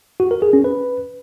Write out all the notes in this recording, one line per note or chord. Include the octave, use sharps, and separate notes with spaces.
F#4
A#4
G#4
C#4
B4